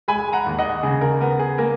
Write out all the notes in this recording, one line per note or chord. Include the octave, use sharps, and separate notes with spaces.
G#3 G#5 B5
F#5 A#5
D#2
D#5 F#5
C#3 G#4
A#4
B3 A#4
G#4
A#3 A#4